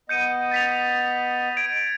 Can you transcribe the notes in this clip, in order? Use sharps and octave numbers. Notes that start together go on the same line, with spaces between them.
B3 D#5 G6 C#7 D#7
A6 B6 F7
G#6 D7